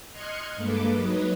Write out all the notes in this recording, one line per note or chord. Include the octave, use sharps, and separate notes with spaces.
D#5 C6 F6 F#6 G#6 C#7
G2 G#3 A#3 A4 B4 D6
F#3 D#4 B4 C#5 D#5